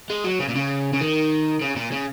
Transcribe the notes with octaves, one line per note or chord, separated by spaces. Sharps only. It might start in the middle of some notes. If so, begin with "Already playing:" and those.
G#3
F#3
C#3
A#2
C#3
C#3
D#3
C#3
A#2
C#3